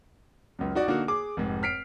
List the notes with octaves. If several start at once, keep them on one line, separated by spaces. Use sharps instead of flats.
C#2 F#2
D#4 F#4 D5
D3 A#3 D#4 F#4
G#4 D6
F1 G#2
F6 B6 C7 D7